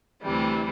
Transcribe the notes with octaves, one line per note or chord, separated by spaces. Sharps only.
D2 C3 E3 G3